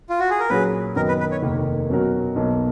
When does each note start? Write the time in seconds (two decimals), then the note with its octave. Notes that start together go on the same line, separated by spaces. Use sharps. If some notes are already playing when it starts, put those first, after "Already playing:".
0.10 F4
0.19 F#4
0.30 G#4
0.40 A#4
0.50 A#2 F#3 C#4 G#4 B4
0.96 F#2 D#3 F#3 B3 D#4 A#4
1.08 B4
1.20 B4
1.32 C#5
1.42 F1 D#2 D#3 A#3
1.90 B2 F#3 C#4 F#4 A#4
2.36 B1 B2 F#3 A#3